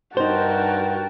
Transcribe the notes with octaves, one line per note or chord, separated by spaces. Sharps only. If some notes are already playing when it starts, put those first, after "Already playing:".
G2 D#4 F#4 A#4 C5 G5 A5